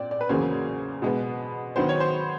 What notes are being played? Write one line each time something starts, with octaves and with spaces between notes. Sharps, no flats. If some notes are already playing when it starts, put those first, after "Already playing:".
Already playing: A#2 C4 D5 G5
D5
B4
E2 C#3 F#3 A#3 C#4 C5
B2 G#3 B3
D#3 F#3 B3 C5
C#5
C5